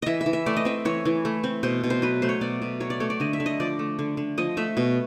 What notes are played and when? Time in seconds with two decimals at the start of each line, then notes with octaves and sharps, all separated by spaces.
0.02 E3 D#5 E5
0.21 E5
0.26 E3
0.33 E5
0.46 A3 D5
0.57 D#5
0.65 C4 E5
0.85 E3 C#5
1.05 E3
1.25 A3
1.44 C4
1.63 B2 C5
1.84 B2
1.90 C5
2.02 F#3 B4
2.22 A3 C5
2.29 C#5
2.41 B2 D5
2.62 B2
2.80 F#3 C#5
2.90 D5
3.00 A3 C#5
3.10 D5
3.20 D3 D#5
3.33 E5
3.40 D3
3.46 D#5
3.60 F3 D5
3.79 A3
3.99 D3
4.17 D3
4.38 F3 D#5
4.57 A3 E5
4.77 B2